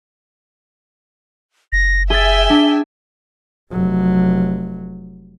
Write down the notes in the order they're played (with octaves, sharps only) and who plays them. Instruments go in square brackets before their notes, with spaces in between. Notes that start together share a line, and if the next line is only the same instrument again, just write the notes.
[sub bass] F#1 [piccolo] A#6
[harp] G#4 A6 [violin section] E5 G5 G#5 [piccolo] G7
[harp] D4
[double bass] F1 F#3